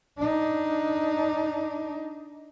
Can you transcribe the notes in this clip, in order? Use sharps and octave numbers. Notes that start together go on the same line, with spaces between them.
D4 D#4